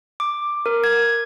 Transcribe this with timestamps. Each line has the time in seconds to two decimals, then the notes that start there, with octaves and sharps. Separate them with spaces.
0.20 D6
0.66 A#4
0.84 G#6